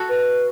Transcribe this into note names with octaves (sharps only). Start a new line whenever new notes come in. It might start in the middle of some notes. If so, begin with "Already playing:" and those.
Already playing: F#4 A4
B4